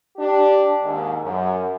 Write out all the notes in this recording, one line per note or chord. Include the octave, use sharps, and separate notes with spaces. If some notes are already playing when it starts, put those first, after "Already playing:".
D4 G4
D#2 G#2
F#2